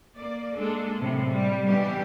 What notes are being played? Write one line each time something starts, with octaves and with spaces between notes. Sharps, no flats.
A#3 D5
G#3 A#3 D4 A4
A2 C3 F#3
G3
B2 E3 G3 D4 G4